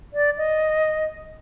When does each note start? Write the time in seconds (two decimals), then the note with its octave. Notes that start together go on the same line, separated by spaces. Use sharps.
0.14 D5
0.38 D#5